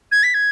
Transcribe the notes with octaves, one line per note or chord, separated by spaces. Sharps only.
G#6
B6
G#6